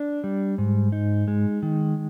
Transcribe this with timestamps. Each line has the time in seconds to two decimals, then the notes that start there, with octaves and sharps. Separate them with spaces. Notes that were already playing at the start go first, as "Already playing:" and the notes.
Already playing: D4
0.24 G3
0.58 G#2
0.92 D#4
1.28 G#3
1.63 D#3